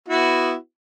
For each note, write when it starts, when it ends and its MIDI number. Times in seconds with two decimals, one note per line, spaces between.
0.08 0.54 59
0.08 0.54 64
0.08 0.54 66